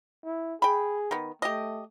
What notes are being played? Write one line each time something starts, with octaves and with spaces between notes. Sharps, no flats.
E4
G#4 G5 B5
D#3 B3
A3 G4 D#5